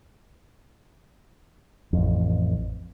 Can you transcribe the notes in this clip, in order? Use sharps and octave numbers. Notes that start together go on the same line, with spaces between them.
A1 F2